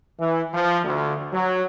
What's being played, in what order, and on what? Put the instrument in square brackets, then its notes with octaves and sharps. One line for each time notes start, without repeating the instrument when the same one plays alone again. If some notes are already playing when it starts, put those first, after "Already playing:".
[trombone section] E3
F3
D2
F#3